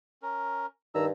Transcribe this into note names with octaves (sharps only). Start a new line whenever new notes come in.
C#4 A#4
G2 D#3 A#5 E6